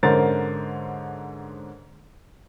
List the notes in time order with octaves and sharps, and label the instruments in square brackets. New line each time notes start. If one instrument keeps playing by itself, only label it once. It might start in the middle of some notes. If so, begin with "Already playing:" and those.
[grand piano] G#2 D3 C#4 A#4 C5 A6